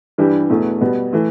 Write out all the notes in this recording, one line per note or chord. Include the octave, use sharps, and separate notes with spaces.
G2 E3 G3 D4 G4
E2 B2 A3
B2 G3 B3
E3 A3